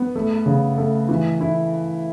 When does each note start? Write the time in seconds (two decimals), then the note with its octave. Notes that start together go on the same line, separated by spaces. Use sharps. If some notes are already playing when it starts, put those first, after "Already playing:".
Already playing: B3
0.15 A3
0.46 C#3
0.78 A3
1.09 E3
1.41 E4